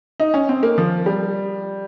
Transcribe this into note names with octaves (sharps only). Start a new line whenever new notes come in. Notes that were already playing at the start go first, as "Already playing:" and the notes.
D#4
C#4
C4
A#3
F3
G3